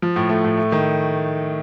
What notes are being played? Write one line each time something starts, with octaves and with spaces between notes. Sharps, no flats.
F3
A2
A3
A2
A3
D#3